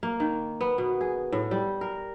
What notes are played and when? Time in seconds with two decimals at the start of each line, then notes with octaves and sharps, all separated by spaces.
0.03 A#3
0.20 D#3
0.61 B3
0.78 B2
1.01 G#4
1.32 A2
1.51 G3
1.81 A#4